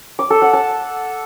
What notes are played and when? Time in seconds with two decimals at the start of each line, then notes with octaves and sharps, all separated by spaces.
0.19 D6
0.30 A4
0.42 F#5
0.53 A5